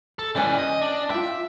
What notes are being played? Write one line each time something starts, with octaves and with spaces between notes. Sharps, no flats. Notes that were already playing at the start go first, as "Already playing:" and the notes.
A4
E3 G3 C#4 B4 G#5
D#5
D4
F4 E5 G5